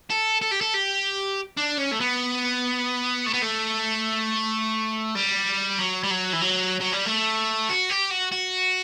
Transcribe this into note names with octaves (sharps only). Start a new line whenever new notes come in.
A4
A4
G4
A4
G4
D4
C#4
A3
B3
A3
B3
A3
G3
F#3
G3
F#3
E3
F#3
F#3
G3
A3
F#4
G4
F#4
F#4